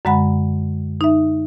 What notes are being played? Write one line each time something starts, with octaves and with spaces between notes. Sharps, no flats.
F#2 D3 G#3 F#5 B5
D#4 E5